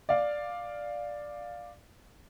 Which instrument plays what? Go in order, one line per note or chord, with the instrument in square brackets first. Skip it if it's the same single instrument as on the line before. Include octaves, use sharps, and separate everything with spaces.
[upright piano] D5 F5